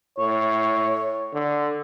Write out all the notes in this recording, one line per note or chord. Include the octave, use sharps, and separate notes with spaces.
A2 C#5
D3